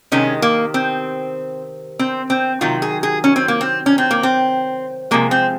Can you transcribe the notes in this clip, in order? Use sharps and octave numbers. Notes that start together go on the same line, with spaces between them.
C3 D#3 G#3 C#4
A#3
C4
C4
C4
C3 D#3 F#3 F4
G#4
G#4
C#4
C4
A#3
C4
C#4
C4
A#3
C4
C3 F3 G#3 A#3
C4